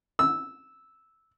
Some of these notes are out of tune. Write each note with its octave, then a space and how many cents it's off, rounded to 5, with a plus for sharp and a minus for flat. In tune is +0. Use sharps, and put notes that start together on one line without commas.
E6 -10